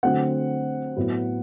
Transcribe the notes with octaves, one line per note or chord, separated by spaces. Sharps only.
D3 F#3 A3 C4 F#5
A2 F#3 B3